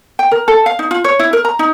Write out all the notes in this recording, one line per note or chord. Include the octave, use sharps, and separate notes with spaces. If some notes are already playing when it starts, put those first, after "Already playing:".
G5
A#4
A4
F5
D#4
F4
C#5
E4
A#4
A#5
D#4